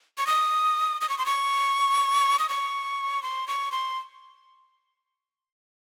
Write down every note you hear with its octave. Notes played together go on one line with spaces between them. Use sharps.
C#6
D#6
D#6
C#6
C6
C#6
D#6
C#6
C6
C#6
C6